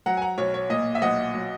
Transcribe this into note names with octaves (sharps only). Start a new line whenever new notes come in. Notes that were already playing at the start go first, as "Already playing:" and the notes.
F#3 F#5 A#5
G#5
F#5 A#5
B1 C#5
C#5
A#2 D#5
E5
B1 D#5 F#5
F#3